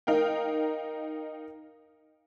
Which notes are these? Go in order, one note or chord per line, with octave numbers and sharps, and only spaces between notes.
D#4 A#4 F5 G5